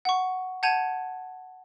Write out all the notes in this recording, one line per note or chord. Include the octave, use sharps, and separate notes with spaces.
F#5 C#6
F#5 A5 G6 G#6 D#7 F7